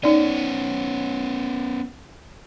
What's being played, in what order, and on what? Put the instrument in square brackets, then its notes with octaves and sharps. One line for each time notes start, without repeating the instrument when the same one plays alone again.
[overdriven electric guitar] B3 C#4 [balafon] D#4 D5